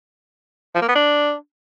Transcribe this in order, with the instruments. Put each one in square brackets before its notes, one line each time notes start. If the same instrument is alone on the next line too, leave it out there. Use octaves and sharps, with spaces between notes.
[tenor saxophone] F3
A#3
B3
D4